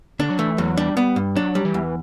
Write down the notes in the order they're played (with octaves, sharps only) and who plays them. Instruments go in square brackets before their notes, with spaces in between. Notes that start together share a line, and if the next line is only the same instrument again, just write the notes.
[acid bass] D3 [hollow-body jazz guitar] D4
[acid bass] F#3
[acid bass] E3 [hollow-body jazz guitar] A3
[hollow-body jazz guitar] E2 [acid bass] F#3
[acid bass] G3 [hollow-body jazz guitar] D4
[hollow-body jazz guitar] B3
G2
[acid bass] F#3 [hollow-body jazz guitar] D4
[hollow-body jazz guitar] G3
[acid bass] E3
[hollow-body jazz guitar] E2